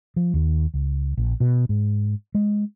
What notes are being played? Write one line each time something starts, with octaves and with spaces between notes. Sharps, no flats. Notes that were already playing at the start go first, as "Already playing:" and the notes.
F3
D#2
C#2
A#1
B2
G#2
G#3